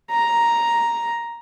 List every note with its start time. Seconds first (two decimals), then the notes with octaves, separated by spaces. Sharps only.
0.11 A#5